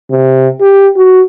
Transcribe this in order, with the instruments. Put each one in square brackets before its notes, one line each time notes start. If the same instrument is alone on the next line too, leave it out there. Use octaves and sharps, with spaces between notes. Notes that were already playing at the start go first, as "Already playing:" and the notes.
[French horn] C3
G4
F#4